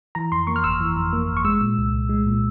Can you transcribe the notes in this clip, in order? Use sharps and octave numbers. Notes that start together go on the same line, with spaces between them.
E3 A#5
F2 C6
A#3 C#6
F6
G1 E6
E3
F2
A#3
G1
C#6
G#3 E6
A#2
C2
C2
G#3
A#2